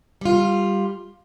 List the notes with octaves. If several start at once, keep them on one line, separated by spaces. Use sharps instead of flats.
G3 F4